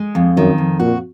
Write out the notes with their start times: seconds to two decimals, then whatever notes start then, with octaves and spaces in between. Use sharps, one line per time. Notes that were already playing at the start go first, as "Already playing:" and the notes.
Already playing: G#3
0.15 F2
0.37 F#2 D#3
0.58 F2
0.80 A#2 F#4